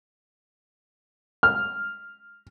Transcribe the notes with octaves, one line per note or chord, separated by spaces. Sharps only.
F6